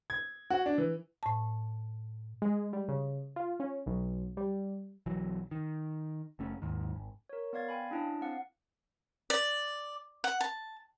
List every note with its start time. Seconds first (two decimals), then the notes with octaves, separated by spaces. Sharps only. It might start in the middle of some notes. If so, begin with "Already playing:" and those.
0.10 G#6
0.50 F#4
0.66 D4
0.78 E3
1.23 A2 A5
2.42 G#3
2.73 G3
2.88 C#3
3.36 F4
3.60 C#4
3.86 B1
4.37 G3
5.06 B1 E3 F#3
5.51 D#3
6.39 F#1 A3 C#4
6.62 D#2 G#2 D#3
6.95 G#1
7.29 A#4 C#5
7.53 B3 D5 F5 G#6 A6
7.69 F5 G5 G#5 B5
7.91 C#4 D4 E4 D#5 A5
8.22 C4 F5 F#5
9.30 D5
10.24 F#5
10.41 A5